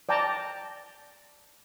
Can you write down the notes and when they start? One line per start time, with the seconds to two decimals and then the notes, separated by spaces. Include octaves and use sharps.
0.09 D5 G5 A5 A#5